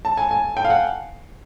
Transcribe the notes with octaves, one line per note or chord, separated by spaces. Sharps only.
A5
G#5
G#5
G5
F5
F#5